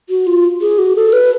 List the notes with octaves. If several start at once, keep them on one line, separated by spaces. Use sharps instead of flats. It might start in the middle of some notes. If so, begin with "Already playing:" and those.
F#4
F4
G#4
F#4
A4
B4